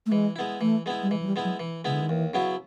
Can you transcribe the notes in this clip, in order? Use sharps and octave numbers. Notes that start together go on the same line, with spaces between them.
A3
E3 G#3
G#3 B3 E4
E3 A3
G#3 B3 E4
G3
E3 G#3
F#3
G3
G#3 B3 E4
F#3
E3
C#3 G#3 B3 E4
D3
D#3
D#2 E3
C#3 F#3 B3 E4